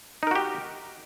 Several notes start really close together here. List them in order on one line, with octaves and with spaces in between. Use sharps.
D#4 A#4 F#4 G4